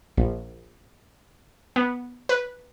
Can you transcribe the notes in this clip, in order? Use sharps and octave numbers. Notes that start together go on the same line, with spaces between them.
A#1
B3
B4